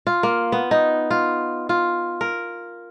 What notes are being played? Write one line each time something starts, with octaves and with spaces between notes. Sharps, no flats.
F4
A#3
B3
D#4
F4
F4
A#4